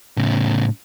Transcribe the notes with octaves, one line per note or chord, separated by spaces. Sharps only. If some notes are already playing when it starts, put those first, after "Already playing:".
A2 C#3